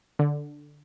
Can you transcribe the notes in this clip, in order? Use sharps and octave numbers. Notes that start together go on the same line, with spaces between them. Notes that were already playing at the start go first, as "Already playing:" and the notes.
D3